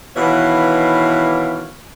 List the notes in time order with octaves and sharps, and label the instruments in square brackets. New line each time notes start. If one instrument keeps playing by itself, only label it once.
[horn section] B2 D#3 E3 C#5 F5